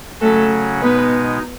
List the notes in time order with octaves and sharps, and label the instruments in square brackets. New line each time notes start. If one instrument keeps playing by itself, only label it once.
[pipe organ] C#3 F#3 C#4 F#4 [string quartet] A3 A4
[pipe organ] B2 G#3 D#4 [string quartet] B3 B4